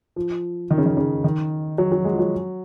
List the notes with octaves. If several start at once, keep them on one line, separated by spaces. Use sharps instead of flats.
F3
D#3
C#3
D#3
C#3
D#3
F#3
F#3
G#3
F3
F#3